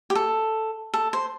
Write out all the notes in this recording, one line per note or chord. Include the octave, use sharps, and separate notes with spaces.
G4
A4
A4
C5